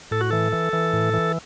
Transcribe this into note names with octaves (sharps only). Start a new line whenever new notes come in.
A2 A4
F#4
E3 A4
E3
E3
A2
E3